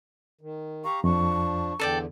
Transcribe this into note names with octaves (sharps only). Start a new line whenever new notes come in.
D#3
G4 F5 A#5 C#6
F2 F3 D4 C#6
E2 D3 A4 D5 G5